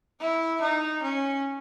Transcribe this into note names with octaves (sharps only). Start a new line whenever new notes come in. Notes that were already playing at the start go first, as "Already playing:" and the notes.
E4
D#4
C#4